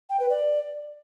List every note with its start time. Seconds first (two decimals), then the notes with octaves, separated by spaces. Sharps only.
0.10 G5
0.20 B4
0.30 D5